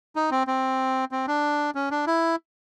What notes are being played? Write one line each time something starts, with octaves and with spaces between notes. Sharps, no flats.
D#4
C4
C4
C4
D4
C#4
D4
E4